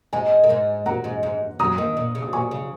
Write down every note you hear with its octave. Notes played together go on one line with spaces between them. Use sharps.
G#2 G#3 G#5
A#3
G#2 G#3
A#2 A#3 F#5 A#5
G#2 G#3
G#2 G#3
F#2 F#3 A#5 D#6
D#2 D#3
A#2
C#3
D#6
A#2 G#5 C#6
C#3